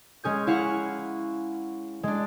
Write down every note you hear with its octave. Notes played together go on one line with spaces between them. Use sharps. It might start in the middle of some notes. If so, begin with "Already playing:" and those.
G#3 C#4 G#4 G6
E4 F5 F#5 C#6
G#3 D4